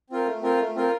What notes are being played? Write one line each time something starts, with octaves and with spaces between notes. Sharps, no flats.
C4 F4 A#4
A3
C4 F4 A#4
A3
C4 F4 A#4